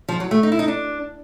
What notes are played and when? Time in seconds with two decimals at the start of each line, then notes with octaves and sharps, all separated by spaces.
0.08 F3
0.20 F#3
0.31 A3
0.43 D#4
0.52 E4
0.59 D#4
0.68 D4